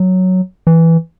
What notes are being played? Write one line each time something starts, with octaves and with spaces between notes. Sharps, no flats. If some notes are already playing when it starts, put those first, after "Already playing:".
Already playing: F#3
E3